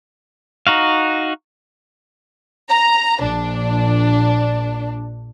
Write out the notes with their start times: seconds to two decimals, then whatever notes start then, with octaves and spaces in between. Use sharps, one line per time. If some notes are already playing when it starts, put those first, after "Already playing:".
0.67 D#4 F#4 F5
2.69 A#5
3.22 A#1 D4